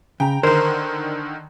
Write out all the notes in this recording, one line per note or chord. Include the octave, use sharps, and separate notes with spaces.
C#3 G5 A#5
D3 D#3 A#4 C5